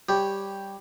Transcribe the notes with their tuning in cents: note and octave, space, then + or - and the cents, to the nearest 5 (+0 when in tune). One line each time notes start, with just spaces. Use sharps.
G3 +5 G4 +0 C#5 -15